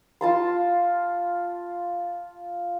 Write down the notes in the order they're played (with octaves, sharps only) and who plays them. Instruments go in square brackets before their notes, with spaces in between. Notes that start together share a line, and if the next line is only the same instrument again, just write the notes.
[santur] F4 A5 C6